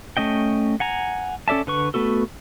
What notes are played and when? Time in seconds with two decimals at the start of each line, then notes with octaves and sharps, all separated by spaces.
0.17 A3 C#4 D#5 G5
0.80 F#5 G#5 A#5
1.48 C#4 A4 D5 E5 A5
1.67 D3 B4 C#6
1.94 A3 B3 F#4 A4